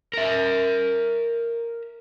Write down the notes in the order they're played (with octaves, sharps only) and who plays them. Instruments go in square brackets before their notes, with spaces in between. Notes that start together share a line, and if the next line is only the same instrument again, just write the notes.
[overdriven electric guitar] A#4 E5